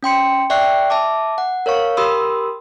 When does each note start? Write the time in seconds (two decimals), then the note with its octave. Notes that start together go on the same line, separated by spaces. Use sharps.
0.03 C#4 G5 C6 C#7
0.50 D5 E5 G5 C#6 F#6 C7
0.90 E5 A5 D6
1.38 F#5
1.66 A#4 C#5 F5 C#6
1.97 G4 A#4 B5 C6 D#6 E6